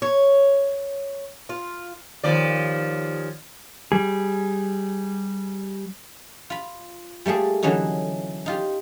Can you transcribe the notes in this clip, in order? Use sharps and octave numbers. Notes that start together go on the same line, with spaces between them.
C#5
F4
D#2 F3 D5
G3 G#4
F4 B5
G3 A3 A#3 G#4
D3 E3 F#3 C#4 D#4
D#4 F4 G4